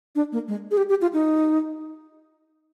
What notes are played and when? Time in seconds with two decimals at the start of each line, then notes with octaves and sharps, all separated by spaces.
0.16 D4
0.32 A#3
0.48 G#3
0.71 G#4
0.77 G4
0.89 G4
1.02 F4
1.13 D#4